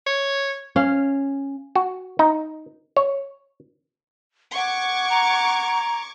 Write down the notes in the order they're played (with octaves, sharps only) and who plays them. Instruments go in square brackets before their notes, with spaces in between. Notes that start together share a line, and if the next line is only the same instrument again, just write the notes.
[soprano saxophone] C#5
[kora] C#4 F5
[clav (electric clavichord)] F#4
D#4
C#5
[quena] F#5 [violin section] C#6 D6 G#6
[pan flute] A#5